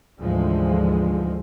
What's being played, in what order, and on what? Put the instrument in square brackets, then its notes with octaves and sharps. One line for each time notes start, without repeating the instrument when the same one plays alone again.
[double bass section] D2 G#2 D3 E3 F3 G#3